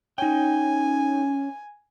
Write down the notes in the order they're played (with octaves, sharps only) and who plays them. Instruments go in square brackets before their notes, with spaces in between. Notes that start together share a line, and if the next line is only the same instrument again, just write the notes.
[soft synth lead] C#4 [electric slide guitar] D#4 G5 [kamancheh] G#5